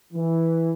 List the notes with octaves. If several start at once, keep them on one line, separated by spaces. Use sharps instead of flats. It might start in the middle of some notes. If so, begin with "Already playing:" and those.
E3